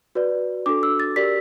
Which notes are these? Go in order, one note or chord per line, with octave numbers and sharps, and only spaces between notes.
F#4 B4 D5
D4 F#4 A4 D6
E6
A6
G4 A#4 D5 B6